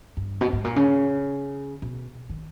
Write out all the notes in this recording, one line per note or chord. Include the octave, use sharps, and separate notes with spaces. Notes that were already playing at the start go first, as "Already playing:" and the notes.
G2
B2
G#2
A#2
C#3
B2
D#3